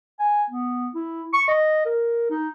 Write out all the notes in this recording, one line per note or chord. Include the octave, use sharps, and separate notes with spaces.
G#5
B3
E4
C#6
D#5
A#4
D#4